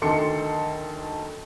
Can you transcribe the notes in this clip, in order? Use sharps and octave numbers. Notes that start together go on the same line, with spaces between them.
D2 D#3 A4 C6 C#7